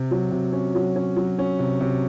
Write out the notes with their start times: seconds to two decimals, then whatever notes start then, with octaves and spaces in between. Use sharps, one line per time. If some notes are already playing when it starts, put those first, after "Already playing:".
Already playing: C3
0.11 F#3
0.31 C3
0.53 C#4
0.75 F#3
0.96 C#4
1.16 F#3
1.39 C#4
1.59 C3
1.81 C3